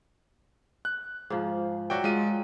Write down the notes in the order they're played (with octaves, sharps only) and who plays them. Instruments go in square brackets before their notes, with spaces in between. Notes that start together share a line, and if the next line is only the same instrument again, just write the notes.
[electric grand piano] F#6
[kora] G#2 F3
[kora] F#3 D5 E5 [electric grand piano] F#4 G5
[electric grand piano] G#3 F4 D#7